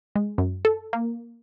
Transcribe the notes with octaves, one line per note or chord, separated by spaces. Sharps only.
G#3
F#2
A4
A#3